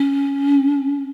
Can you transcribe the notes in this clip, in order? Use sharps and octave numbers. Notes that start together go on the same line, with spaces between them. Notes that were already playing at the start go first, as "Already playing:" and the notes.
Already playing: C#4